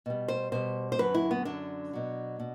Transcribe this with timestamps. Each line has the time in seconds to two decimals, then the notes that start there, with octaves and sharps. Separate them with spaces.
0.06 B2 G3
0.28 C5
0.52 B2 G3 C5
0.92 C5
0.98 F#2 D3 F#3 B4
1.14 E4
1.31 B3
1.45 F#2 D3 F#3 D4
1.93 B2 F#3
2.40 B2